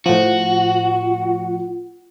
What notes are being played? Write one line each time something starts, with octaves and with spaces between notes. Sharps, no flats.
A2 F3 F4 F#4